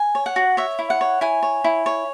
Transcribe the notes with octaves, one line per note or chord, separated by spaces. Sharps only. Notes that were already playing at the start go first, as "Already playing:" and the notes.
Already playing: G#5
C#5
F#5
F#4
C#5 E5
E4
F#5
C#5
E4 G#5
C#5
E4
C#5